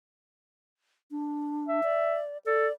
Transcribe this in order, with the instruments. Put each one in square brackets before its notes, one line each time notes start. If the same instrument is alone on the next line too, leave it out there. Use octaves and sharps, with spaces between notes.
[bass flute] D4
[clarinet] E5
[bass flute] D5
[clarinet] A4 [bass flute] D5